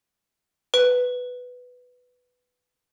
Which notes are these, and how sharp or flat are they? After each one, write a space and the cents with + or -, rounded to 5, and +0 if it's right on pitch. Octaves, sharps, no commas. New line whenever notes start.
B4 +5